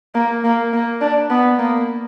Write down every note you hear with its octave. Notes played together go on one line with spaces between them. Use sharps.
A#3
A#3
A#3
D4
B3
A#3